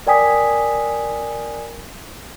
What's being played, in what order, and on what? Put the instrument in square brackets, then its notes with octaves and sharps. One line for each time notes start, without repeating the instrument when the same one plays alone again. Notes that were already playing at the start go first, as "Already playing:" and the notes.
[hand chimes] A#4 D5 G5 G#5 D#6 B6